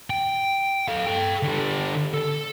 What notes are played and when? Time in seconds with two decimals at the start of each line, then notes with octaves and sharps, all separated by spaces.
0.10 G5
0.88 A4 F5
1.07 A4 G5
1.43 D3 G3
2.14 A4